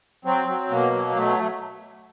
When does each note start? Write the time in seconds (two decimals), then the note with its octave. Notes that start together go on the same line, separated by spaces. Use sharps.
0.25 F#3 C4
0.48 F#3
0.71 B2 A#3
0.92 F#3
1.16 B2 A3